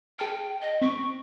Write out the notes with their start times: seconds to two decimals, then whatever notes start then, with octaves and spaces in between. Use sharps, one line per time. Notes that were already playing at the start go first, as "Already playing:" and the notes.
0.19 G#4 G5 A5 F6
0.61 D#5
0.81 C4 C#6 B6 D7